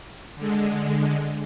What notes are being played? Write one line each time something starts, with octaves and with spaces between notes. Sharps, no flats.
D3 G#3